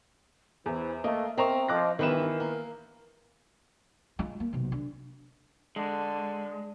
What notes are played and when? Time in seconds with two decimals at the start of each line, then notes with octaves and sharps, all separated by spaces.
0.66 E2 E3 C5
1.04 A3 A#3 D#5 F5
1.38 C4 A#4 D#5 E5 A#5 C#6
1.68 F3 D#5 D6 F#6 A#6
1.99 G2 D#3 E3 B3 A#4 B4 E5 E7
2.40 A#3
4.19 G#3 F4
4.40 A#3
4.53 B1 C3
4.72 D3
5.76 D3 G#3